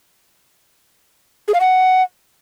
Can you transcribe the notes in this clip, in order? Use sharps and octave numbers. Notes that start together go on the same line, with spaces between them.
G#4
F5
F#5